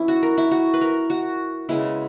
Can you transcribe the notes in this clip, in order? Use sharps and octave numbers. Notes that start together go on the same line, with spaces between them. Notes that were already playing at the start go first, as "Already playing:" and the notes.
Already playing: E3 B3 C#4 E4
F#4
A#4
E4
F#4
B4
A#4
F#4
C#3 G#3 B3 E4